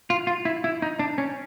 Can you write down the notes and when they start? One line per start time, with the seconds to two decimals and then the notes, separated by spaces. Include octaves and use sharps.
0.10 F4
0.27 F4
0.45 E4
0.64 E4
0.82 D#4
0.99 D4
1.18 C#4